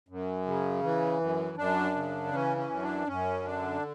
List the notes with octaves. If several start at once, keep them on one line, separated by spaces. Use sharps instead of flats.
F#2
C#3
E3
F#2
F#2 D4
C#3
E3 C#4
C#4
F#2
D4
F#2 C#4
D3 D4